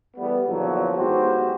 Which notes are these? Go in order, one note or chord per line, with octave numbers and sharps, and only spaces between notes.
E2 G3 A3 B3
E2 A#2 D3 F3 F#3
G#2 B3 E4 F#4 G4 C5